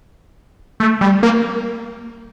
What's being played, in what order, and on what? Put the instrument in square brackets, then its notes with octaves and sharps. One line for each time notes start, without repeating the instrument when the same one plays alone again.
[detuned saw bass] A3
G3
A#3